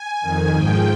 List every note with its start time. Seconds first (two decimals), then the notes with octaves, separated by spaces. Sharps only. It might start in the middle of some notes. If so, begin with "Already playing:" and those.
Already playing: G#5
0.21 F2 D#3
0.54 G#2 F3 G5